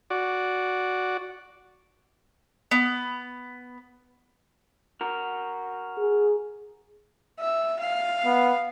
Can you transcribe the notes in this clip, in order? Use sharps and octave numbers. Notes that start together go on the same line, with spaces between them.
F#4 D5
B3
F#4 A#4
G#4
E5
F5
B3